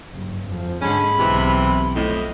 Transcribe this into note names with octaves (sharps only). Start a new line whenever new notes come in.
F#1 G2
F2 F3
G#2 D3 G#3 C#4 B5
B1 C3 E3
F2 A2 D#5